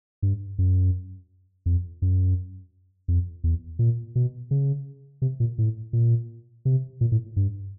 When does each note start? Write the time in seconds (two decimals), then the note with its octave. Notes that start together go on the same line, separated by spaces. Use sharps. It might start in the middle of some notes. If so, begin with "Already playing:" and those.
0.22 G2
0.58 F#2
1.66 F2
2.02 F#2
3.08 F2
3.44 E2
3.79 A#2
4.15 B2
4.51 C#3
5.22 C3
5.40 A#2
5.58 A2
5.93 A#2
6.65 C3
7.01 A#2
7.12 A2
7.36 G2